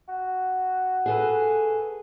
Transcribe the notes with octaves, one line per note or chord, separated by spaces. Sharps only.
F#4
G#4 A4 B4